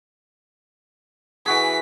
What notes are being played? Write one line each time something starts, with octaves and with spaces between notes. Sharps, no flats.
E3 F#4 G#4 B6